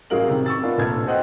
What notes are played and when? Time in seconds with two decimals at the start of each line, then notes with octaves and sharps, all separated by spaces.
0.10 A1 F#3 G#4 A#4 F5 F#7
0.28 C3 D#3
0.46 C#6 E6 A6
0.63 B3 D4 F4 A#4
0.78 F1 A#1 D4 A4 F6 G#6
1.07 F#4 C5 D#5 F#5 G5 F#6